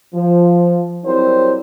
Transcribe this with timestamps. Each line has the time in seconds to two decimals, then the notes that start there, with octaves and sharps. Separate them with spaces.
0.15 F3
1.05 F#3 G3 C4 E4 A#4 C5